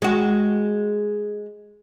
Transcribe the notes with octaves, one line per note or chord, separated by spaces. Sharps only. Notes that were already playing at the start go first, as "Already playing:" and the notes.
G#3 F#4